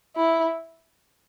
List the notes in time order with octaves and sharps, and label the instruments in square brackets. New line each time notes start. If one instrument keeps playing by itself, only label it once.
[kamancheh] E4